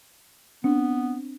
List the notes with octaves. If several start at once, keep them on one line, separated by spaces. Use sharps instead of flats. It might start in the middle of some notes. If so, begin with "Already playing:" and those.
B3 C4 D4